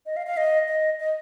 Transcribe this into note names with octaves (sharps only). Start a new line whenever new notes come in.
D#5
F5
F5
D#5
D#5
D#5